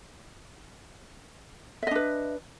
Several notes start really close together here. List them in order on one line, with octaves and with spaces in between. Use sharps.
E5 D#5 D4 B4